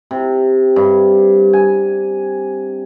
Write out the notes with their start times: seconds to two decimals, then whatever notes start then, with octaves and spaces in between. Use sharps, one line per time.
0.11 C3
0.76 G2
1.53 G#5